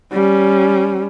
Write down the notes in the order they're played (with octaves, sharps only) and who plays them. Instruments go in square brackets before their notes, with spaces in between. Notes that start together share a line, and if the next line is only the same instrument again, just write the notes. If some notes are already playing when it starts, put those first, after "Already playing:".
[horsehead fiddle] G3 C#4